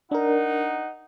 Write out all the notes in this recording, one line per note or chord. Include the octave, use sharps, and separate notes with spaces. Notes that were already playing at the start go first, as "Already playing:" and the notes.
D4 D#4 A#4 F#5